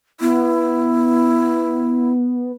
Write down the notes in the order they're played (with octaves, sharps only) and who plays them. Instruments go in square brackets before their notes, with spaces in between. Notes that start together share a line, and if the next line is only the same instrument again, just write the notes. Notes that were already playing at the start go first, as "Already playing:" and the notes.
[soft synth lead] B3 [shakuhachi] E4